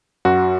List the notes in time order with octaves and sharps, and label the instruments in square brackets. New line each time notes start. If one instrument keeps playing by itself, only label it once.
[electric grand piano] F#2 F#4